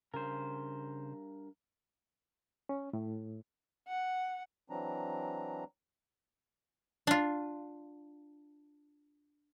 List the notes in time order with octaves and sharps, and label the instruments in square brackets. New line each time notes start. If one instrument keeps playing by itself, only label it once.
[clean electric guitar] G2 A#4 [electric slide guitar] C#3 C5
[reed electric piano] C#4
A2
[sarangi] F#5
[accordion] E3 F#3 C4 D4 A#5
[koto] D4 F4